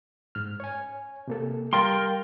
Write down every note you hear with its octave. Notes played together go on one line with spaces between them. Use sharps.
G#2 F6
C#5 G#5
C3 A#3 A4
G3 A#4 F5 G5 C6 A6